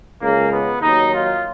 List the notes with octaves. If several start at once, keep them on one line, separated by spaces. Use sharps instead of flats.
C#2 C#3 G#3 A#3
B3
D#2 D#3 F#3 D#4
F4